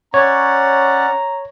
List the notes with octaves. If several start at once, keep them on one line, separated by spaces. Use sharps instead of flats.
C#4 C#5 D5 F#5 A#5